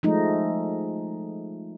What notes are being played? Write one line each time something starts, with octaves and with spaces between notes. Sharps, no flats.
F3 G#3 A3 D#4